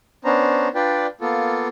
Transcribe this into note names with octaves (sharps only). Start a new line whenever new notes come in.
B3 C#4 D4 C5 A#5
D4 F4 B4 D5 G5
A#3 B3 F4 A4